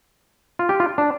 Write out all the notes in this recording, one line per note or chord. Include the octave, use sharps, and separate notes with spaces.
F4
G4
F4
D4